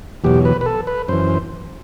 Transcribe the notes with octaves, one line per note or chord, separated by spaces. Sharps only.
E2 B2 F#3 G4
B4
B4
A4
B4
F#2 E3 C5